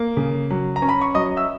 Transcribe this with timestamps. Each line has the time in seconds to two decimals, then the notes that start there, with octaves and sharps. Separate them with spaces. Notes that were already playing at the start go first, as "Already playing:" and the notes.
Already playing: A#3
0.17 C#3
0.50 F#3
0.76 A#5
0.82 C#4
0.89 B5
1.01 C#6
1.15 F#3 D#5 D#6
1.37 E5 E6